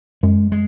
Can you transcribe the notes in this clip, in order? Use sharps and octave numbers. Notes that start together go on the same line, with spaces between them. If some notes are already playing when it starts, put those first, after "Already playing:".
F#2 G#3
G#3